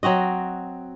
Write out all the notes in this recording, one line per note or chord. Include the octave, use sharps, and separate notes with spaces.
F#3 C4 F#4 D#5